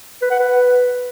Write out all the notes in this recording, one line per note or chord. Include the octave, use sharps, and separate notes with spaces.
B4
F#5
B4